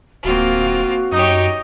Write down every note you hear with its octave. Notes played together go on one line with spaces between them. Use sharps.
D1 A#3 C4 F4 F#4
F#2 D#4 G4 C#5 D#5